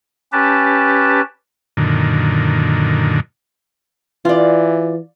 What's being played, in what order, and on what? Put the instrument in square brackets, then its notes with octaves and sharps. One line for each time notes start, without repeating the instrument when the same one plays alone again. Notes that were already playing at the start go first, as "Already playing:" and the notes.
[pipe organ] C#4 G4 B4 A5
[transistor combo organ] F#2 A#2 D3 D#3
[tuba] E3 [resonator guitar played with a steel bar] F4 D5